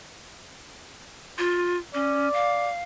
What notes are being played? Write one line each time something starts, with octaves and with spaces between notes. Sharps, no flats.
F4
C#4 D5
F5